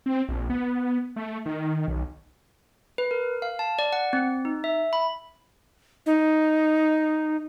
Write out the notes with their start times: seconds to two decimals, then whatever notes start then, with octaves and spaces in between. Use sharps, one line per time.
0.06 C4
0.29 A#1
0.50 B3
1.16 A3
1.46 D#3
1.88 B1
2.98 B4
3.11 A#4
3.42 F5
3.59 A5
3.79 D5
3.93 F#5
4.13 C4
4.45 D#4
4.64 E5
4.93 B5
6.06 D#4